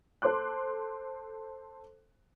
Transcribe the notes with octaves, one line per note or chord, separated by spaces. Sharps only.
A4 C5 C6 D6 F#6